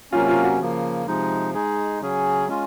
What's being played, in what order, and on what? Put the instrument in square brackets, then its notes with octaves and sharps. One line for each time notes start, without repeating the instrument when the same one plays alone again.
[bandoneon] C3 F#3 A#3 C#4 [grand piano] F4
[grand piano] F4
F#4
[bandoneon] C#3 F3 A#3
C3 F3 G#3 D#4
G#3 D#4 G#4
C#3 F#3 C#4 G#4
G#3 C#4 F4